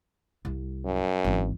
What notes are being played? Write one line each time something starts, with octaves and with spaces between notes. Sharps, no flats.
C2
F#2
G#1 E3